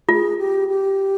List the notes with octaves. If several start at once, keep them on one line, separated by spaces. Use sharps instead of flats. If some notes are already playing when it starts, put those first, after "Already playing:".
F4 G#4
G4
G4